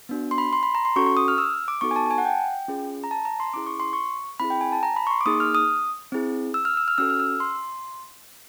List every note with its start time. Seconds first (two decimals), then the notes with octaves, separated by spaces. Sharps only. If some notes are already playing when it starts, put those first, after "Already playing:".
0.09 B3 D4 F#4
0.31 C6
0.38 B5
0.53 C6
0.63 B5
0.75 A#5
0.85 C6
0.96 C#4 F#4 A4 C#6
1.06 C#6
1.17 D#6
1.28 F6
1.38 E6
1.68 D6
1.81 B3 D#4 F#4 A4 C#6
1.91 G#5
1.96 A5
2.06 A5
2.11 G#5
2.18 F#5
2.25 G5
2.68 C#4 F4 G#4
3.04 A#5
3.11 A5
3.25 A#5
3.40 C6
3.53 C#4 E4 G#4 D6
3.67 C#6
3.80 C6
3.93 C#6
4.40 C4 E4 G#4 B5
4.50 G5
4.61 G#5
4.72 A5
4.83 A#5
4.97 B5
5.07 C#6
5.11 C6
5.21 D6
5.26 A#3 D#4 G#4 D#6
5.40 F6
5.55 D#6
6.12 C4 E4 G#4
6.54 E6
6.65 F6
6.77 E6
6.88 F6
6.98 C#4 F#4 A4 E6
7.10 F6
7.20 E6
7.40 C6